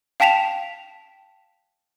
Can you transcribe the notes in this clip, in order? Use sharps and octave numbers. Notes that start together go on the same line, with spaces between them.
F5 G5 A5 B6 E7 F7